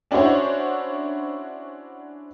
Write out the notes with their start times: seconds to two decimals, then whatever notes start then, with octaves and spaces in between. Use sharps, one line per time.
0.11 C#4 D4 E4 F#4 C5 C#5